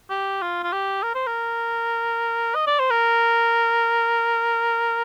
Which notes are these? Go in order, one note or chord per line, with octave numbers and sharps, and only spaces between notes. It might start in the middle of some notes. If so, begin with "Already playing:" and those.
G4
F4
F4
G4
A#4
C5
A#4
D#5
D5
C5
A#4